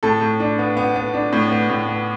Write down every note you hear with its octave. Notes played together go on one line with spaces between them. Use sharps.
A2 A4
A2
D4
B3
B3
B3
D4
A2
B3
A2
B3